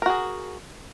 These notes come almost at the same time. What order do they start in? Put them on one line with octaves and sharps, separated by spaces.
A#4 F#4 G#4